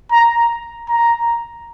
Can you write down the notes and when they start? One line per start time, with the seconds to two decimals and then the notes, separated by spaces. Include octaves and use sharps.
0.12 A#5
0.89 A#5